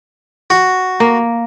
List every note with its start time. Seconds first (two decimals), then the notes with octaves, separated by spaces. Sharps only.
0.50 F#4
1.00 A#3